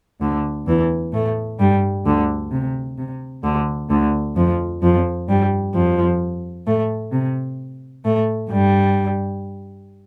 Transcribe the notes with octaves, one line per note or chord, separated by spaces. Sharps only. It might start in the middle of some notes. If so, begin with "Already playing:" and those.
D2 D3
E2 E3
A2 A3
G2 G3
D2 D3
C3
C3
D2 D3
D2 D3
F2 F3
F2 F3
G2 G3
F2 F3
A2 A3
C3
A2 A3
G2 G3